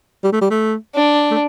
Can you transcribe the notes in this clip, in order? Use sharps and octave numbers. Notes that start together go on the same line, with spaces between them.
G3
A3
G3
A3
D4
A3